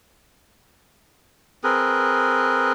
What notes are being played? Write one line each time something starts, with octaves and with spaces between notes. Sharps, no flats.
C4 G#4 A#4 B4